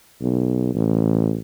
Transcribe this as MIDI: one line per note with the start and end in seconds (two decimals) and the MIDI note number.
0.21 0.71 35
0.74 1.40 33